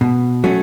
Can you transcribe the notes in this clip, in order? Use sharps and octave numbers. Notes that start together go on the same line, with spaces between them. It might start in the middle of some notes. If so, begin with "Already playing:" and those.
B2
F#3 A3 C#4